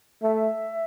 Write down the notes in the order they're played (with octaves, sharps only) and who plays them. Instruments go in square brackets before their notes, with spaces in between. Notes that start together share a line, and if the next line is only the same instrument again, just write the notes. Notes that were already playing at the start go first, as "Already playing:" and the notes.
[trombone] A3 [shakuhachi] E5